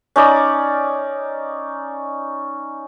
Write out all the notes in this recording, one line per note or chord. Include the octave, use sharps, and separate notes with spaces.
C#4 D#4 D5